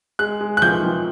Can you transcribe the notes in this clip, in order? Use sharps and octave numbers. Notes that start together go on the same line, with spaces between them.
G#3 F#6
G#3
F#6
F3 G6
F3